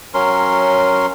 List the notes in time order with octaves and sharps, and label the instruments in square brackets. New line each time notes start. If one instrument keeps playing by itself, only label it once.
[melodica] F#3 C#4 A#4 C6